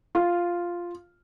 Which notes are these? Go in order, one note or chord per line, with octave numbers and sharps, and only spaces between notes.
F4